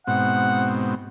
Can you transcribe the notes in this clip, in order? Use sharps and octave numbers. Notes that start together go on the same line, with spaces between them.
G#2 B2 C4 F#5